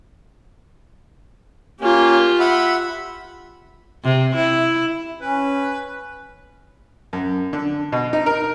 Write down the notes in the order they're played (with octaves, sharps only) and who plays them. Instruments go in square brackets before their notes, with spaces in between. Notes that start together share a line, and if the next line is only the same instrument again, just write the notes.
[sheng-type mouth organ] A#3 C#4 [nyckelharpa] F4 G4
[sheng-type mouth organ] E5 F#5 B5
[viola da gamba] C3
E4
[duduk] C#4 [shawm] B4
[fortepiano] F#2
D3
B2
D#4
A#4